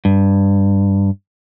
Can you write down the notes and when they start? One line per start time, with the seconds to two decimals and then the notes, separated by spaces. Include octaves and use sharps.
0.05 G2